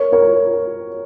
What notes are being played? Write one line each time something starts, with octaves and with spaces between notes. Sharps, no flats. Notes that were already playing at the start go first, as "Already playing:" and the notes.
Already playing: A#4 C#5
A#4 C#5